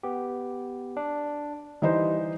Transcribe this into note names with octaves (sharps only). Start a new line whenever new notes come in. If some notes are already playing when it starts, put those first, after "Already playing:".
B3 G4
D4
E3 G3 D#4 C5